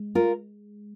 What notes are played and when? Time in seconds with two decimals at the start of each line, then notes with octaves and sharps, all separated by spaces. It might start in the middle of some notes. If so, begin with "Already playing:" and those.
Already playing: G#3
0.15 F4 A#4